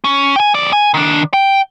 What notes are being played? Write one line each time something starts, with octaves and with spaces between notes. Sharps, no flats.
C#4
G5 G#5
F2 D5
G#5
D#3 D4
G5